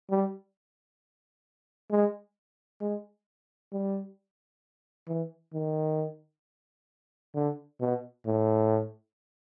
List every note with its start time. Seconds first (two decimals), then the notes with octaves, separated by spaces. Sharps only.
0.10 G3
1.91 G#3
2.81 G#3
3.72 G3
5.08 E3
5.53 D#3
7.35 D3
7.80 B2
8.26 A2